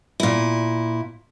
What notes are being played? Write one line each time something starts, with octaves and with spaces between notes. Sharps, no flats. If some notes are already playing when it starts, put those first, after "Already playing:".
A#2 E4